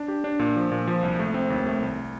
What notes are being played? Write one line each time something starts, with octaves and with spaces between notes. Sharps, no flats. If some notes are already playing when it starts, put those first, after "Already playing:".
Already playing: D4
G4
D4
A#2
F3
A#2
F3
C2
A3
C4
D#2
A3
C2